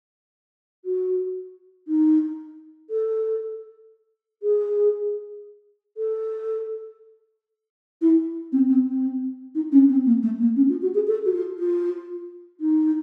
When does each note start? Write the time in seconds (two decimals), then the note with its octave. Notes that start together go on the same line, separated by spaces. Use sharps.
0.85 F#4
1.88 D#4
2.90 A4
4.43 G#4
5.97 A4
8.02 E4
8.52 C4
8.69 C4
8.86 C4
9.55 D#4
9.72 C#4
9.89 C4
10.06 A#3
10.23 A3
10.40 A#3
10.56 C#4
10.69 F4
10.82 F#4
10.95 G#4
11.07 A4
11.25 F#4
11.34 F4
11.59 F4
12.60 D#4